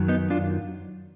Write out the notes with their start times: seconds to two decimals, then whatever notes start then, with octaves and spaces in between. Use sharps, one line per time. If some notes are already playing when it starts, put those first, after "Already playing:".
Already playing: F#2 D#3 F#3
0.08 B3 D#4
0.30 D4 F4